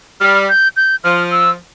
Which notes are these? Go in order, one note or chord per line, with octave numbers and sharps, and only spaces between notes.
G3 F6
G6
G6
F3 F6
E6